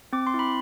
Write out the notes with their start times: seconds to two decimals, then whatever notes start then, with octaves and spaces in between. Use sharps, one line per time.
0.13 C4 D6
0.27 C6
0.34 E4
0.39 B5